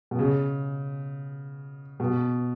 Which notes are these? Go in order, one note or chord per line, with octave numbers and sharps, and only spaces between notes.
B2
C#3
B2